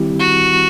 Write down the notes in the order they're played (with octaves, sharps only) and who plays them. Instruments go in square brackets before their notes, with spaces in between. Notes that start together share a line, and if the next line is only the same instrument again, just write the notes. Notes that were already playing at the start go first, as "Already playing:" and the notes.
Already playing: [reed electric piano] D#3 G3 C4 E4 G4
[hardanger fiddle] F#4